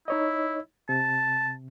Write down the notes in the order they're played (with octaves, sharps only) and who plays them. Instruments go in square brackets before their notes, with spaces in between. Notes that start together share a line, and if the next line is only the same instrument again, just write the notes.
[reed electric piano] D#4 C#5 D#5 [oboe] E4
[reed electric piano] C3 [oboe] A5